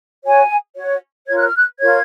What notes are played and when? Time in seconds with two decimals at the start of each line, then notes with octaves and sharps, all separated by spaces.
0.25 F#4 C#5 G#5
0.76 F#4 C#5
1.28 F4 A#4 C#5 G#6
1.37 F#6
1.47 F6
1.57 F#6
1.80 F4 A#4 C#5 G#6